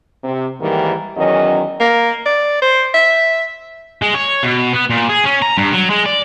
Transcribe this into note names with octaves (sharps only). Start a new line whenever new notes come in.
C3
G#2 D#3 E3 G3 A#3
E2 D#3 F#3 C#4 D#5
A#3
D5
C5
E5
G#3
C#5
B2
B3
A#2
G#4
C#4
A#5
G2
F#3
G#3
D5